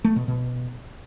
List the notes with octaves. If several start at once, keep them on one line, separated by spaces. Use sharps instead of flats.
A3
B2
B2